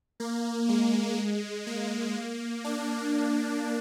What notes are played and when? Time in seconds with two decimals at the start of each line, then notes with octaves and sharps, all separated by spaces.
0.20 A#3
0.69 G#3
1.67 A#3
2.64 D4